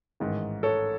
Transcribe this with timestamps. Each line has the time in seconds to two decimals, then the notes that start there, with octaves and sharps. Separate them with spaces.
0.20 A1 G#2 D#3
0.63 A4 C#5